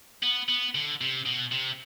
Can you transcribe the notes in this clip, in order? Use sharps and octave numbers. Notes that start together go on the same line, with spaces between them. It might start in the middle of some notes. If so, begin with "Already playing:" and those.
B3
B3
D3
C3
B2
C3